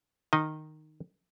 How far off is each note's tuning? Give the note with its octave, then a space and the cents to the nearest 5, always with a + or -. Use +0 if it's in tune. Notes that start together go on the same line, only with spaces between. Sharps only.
D#3 -10 D#4 +0 D#5 +0